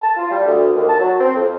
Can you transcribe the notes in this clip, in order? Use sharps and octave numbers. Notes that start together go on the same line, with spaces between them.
A5
F4
G3
D2
D#2
A5
F#3
C4
F2